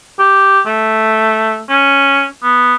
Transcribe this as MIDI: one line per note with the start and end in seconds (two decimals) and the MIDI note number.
0.19 0.60 67
0.66 1.60 57
1.69 2.25 61
2.43 2.75 59